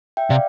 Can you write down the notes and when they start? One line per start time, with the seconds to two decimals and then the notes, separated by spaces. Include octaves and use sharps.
0.17 E5 G5
0.30 C3 D5 F5